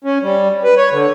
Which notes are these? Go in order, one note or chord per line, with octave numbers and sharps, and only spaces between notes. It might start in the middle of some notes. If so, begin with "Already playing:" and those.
C#4
G3
B4
C#5
D3